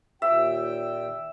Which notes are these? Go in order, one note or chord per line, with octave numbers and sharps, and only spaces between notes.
D#2 A#2 E5 G5